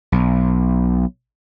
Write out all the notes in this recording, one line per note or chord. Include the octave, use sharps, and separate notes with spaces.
B1